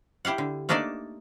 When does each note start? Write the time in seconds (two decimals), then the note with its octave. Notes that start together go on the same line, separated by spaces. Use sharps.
0.25 E4 G4 F5 F#5
0.38 D3
0.69 A3 A#3 D4 D#4 A4 D5